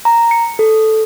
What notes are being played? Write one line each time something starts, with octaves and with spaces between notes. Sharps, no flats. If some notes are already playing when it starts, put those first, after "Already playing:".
A#5
C#7
A4